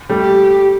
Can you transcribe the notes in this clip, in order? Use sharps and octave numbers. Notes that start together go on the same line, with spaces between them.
G3 A3
G4